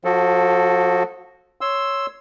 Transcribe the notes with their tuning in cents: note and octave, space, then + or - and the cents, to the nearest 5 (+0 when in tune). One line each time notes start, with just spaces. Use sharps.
F3 +35 F#4 +0 A4 +0
C#5 +0 C6 +5 E6 +0